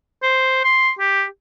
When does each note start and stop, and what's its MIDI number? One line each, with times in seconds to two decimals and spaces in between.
0.23 0.61 72
0.64 0.91 84
0.99 1.25 67